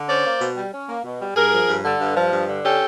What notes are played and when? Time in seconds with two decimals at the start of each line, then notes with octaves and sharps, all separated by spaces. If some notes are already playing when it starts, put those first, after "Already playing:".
Already playing: D3
0.08 C#4 C5 D5
0.25 A#3
0.41 B2
0.56 G3
0.73 C#4
0.88 A#3
1.04 B2
1.20 G3
1.36 G2 G#4 A#4
1.52 F3
1.68 G2
1.85 D3
2.00 G2
2.16 F3
2.32 G2
2.48 D3
2.64 C#4 G4 A4